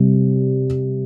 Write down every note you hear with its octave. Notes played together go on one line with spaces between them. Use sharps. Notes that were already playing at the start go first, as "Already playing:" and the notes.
Already playing: C3 G3